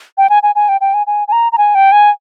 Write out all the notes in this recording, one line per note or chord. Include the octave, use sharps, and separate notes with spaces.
G5
G#5
G#5
G#5
G5
G5
G#5
G#5
G#5
A#5
A#5
G#5
G5
G#5